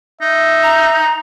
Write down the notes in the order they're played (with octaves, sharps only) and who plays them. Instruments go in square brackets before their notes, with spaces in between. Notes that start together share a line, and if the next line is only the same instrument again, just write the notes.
[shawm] D#4 [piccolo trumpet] E5
[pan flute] A#5